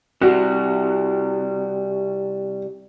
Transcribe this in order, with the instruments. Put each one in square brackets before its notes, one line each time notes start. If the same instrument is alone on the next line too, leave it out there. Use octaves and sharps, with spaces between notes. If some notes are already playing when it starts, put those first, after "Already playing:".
[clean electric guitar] C3 G3 [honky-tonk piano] F#4